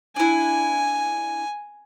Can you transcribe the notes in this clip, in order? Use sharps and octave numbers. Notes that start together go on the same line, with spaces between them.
D4 E4 G#5